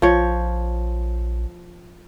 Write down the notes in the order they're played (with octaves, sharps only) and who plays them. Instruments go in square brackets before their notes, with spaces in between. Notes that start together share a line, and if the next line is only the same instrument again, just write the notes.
[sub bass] A#1 [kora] F3 C#5